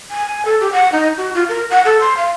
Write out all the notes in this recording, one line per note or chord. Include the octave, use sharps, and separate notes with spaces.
G#5
A4
G4
F#5
D#4
F#4
F4
A#4
F#5
A4
C6
F5